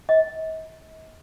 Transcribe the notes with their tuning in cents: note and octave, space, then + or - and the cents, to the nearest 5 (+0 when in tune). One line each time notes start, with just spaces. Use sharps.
D#5 +40